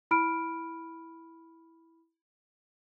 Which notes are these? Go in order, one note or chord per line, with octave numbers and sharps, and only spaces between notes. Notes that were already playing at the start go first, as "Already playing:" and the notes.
E4 B5 F6 D7